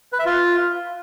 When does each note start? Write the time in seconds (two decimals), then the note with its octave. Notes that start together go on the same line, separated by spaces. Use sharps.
0.13 B4
0.19 E5
0.26 F4